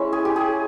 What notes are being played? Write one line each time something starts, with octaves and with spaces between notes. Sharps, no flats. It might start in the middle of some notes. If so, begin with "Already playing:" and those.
Already playing: G#3 C#4 E4
G#4
G4
G#4